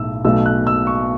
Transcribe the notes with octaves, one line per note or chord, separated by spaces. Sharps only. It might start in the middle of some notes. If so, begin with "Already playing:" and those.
Already playing: B1 A2 E6
B1 B2 A3 E6
F#6
E6
C#6